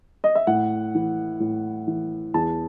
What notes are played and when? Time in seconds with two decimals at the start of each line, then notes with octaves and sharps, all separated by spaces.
0.24 D#5
0.35 E5
0.47 A2 F#5
0.95 E3
1.40 A2
1.87 E3
2.34 E2 A5